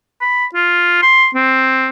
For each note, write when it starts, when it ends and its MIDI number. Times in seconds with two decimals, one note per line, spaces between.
0.21 0.46 83
0.54 0.98 65
1.02 1.28 84
1.35 1.89 60